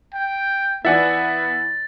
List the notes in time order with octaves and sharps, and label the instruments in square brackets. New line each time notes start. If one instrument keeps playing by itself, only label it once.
[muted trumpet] G5
[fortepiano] E3 D5 [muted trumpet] B3 [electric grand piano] E5 F#5 G#5 [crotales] A6